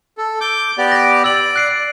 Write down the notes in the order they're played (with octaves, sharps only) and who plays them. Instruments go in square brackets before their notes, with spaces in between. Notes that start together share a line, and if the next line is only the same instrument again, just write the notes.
[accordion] A4
D6 G6
B3 G4 D5
[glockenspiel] A#6
[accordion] D5 [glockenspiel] E6 F#7
[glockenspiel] F#6 C7 D7